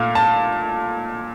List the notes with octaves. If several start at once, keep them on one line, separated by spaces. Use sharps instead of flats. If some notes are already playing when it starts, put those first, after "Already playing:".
Already playing: A#2 A3 F5
A5